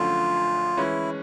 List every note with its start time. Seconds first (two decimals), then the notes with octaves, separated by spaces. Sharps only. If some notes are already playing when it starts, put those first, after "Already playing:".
Already playing: F#2 D3 F3 A3 F4
0.77 E3 G#3 C#4 E4